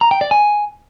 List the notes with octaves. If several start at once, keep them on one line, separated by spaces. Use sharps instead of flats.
A#5
G5
D5
G#5